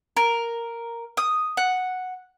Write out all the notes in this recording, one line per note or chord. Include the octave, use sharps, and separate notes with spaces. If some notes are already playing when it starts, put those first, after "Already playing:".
A#4
D#6
F#5